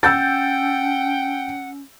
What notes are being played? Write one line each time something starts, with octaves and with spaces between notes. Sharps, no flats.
C#4 F#5 G5 E6 G6 A6